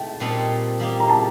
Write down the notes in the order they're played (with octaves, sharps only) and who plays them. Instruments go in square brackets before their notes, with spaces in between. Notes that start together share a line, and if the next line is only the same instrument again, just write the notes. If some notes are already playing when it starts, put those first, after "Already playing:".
Already playing: [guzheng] A3 D#5 [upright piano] G5
[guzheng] A#2 G3 C4 D#4 A4
G3 A#3 D#4 G4
[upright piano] A#5
A5